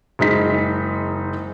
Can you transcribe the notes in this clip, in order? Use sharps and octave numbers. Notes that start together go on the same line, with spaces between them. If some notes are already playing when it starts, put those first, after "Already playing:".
F#1 G#3 D#4 B6